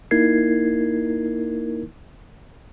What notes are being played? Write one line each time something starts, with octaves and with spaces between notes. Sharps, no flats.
A#3 D#4 E4 A#4 G#6 C7